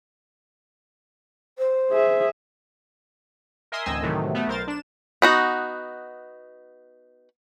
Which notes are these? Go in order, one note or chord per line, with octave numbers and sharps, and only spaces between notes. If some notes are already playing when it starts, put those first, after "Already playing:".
C5
G#4 E5
A#4 D#5 E5 G#5 C6 D#6
A1 D2 C4 D#5 G#5 E6
A2 C3 D#3 E3 F#3 A3
A3 B3
B1 A#4 C5 A6
D4 E7
B3 D#4 F#4